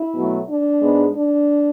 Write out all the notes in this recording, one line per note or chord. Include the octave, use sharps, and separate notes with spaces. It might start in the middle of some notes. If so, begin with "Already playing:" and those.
Already playing: E4
B2 F#3 A3
D4
G#2 G#3 B3
D4